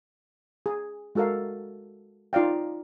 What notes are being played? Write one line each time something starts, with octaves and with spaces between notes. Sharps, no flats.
G#4
G#3 F#4 A4 A#4 F5
D#4 F4 D5 F5 G5